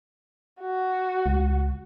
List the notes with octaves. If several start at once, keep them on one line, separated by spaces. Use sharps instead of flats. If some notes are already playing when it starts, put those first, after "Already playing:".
F#4
C#2